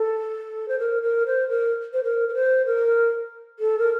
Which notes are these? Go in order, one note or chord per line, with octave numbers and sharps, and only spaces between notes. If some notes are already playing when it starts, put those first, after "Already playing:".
Already playing: A4
C5
A#4
A#4
C5
A#4
C5
A#4
A#4
C5
A#4
A4
A#4